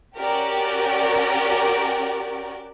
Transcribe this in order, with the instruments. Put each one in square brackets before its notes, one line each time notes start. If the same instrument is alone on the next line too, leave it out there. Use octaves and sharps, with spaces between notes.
[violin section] C#4 F#4 G4 A#4 D5